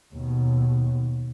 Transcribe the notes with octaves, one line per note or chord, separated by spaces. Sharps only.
D#2 B2